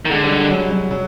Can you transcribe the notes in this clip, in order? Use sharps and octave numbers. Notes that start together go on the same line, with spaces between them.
D#3
D3 G#3
G3
G3
F#3
F#3
F#3